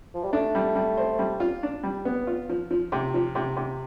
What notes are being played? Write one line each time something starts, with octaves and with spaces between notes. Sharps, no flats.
F3
G3
A3 D4
G3
G3
C5
G3
F4
D4
G3
B3
F4
F3
F3
C3
F3
C3
C3